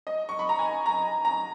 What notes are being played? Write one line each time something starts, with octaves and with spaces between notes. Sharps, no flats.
D#5
C#6
B5
A#5
G#5
A#5
A#5